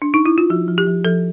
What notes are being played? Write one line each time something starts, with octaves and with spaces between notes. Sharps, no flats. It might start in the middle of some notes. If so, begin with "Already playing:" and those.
D4
D#4
E4
F4
F3 F#4
F3
G4
F3
F3 A4